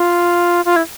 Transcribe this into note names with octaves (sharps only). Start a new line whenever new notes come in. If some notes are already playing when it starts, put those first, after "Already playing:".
Already playing: F4
F4
E4